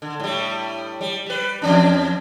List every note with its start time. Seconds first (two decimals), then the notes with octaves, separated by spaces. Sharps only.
0.02 D3
0.20 A2 G3
1.01 G3
1.26 G3 B4
1.62 E2 C#4 D4